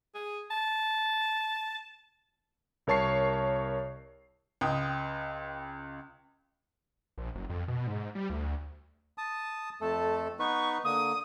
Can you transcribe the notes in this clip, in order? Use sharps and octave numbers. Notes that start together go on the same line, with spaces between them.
G#4
A5
C2 A#4 C#5 A5 C#6 C7
C#2 G5 D#6
A#1
F#1
F2
B2
G#2
G3
D2
A5 D#6
F2 A3 A4 A5
B3 D#4 B4 C#6
D3 A#3 D#6